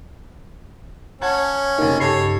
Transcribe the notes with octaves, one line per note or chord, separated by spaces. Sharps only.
C#4 F#5 A5 G#6
F1 C#3 A#3 D#4
G2 G4 A4 C#5 C7